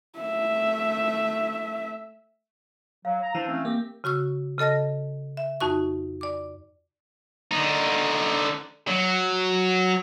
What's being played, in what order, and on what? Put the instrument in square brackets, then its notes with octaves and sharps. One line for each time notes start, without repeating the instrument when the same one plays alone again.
[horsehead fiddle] A3 E5
[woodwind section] F#3 [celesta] F5
[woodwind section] A#5
[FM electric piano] E3 [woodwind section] D4 C5
[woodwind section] A3 C4 C#4
[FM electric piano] A#3 [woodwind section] C4 G4
[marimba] C#3 F#4 C#6 E6
C#3 A4 D#5 A5 A#6
E5
F2 D#4 F#4 C#6
D5 D6
[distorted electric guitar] D3 D#4
F#3